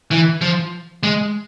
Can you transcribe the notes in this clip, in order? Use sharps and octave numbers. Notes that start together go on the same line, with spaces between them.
E3
F3
G#3